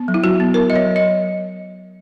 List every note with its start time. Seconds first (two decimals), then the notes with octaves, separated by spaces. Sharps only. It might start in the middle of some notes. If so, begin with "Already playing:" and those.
Already playing: B3
0.08 F#3
0.14 E4
0.24 F#3 F#4
0.40 B3
0.54 B3 A#4
0.70 F#3 D#5
0.76 C#5
0.85 F#3
0.96 D#5